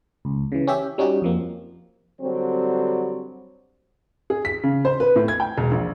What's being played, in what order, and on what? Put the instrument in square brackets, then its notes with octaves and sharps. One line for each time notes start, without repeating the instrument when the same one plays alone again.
[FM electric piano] C#2
C#3 E3
C#4 G4 E5
G3 C#4 D#4 F#4 G4
F2 F3 A#3
[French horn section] D3 F#3 G3 C4
[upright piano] G#4
B6
C#3
C5
B4
A2
G#6
G5
E1
A#1